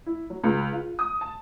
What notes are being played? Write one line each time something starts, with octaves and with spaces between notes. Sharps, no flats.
E4
F#3
C#2
F4
D#6
A5